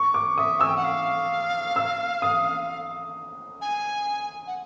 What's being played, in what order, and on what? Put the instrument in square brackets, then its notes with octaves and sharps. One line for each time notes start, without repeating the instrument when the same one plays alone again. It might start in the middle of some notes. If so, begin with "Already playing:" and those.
Already playing: [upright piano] C#6
D6
[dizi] E5 [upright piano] D#6
[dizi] G#5 [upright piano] E6
[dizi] G5
F#5
F5
[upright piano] E6
D#6
[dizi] G#5
F#5